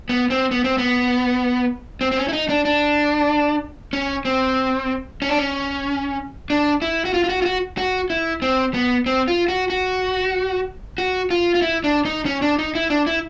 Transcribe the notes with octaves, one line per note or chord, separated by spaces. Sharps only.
B3
C4
B3
C4
B3
C4
C4
C#4
E4
D#4
D4
D4
C#4
C4
C#4
D4
C#4
D4
E4
F#4
F4
F4
F#4
F4
F#4
F#4
E4
C4
B3
C4
F4
F#4
F#4
F#4
F4
F4
E4
D4
D#4
C#4
D4
D#4
E4
D4
E4